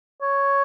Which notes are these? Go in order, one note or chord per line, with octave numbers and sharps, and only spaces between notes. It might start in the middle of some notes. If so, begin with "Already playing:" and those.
C#5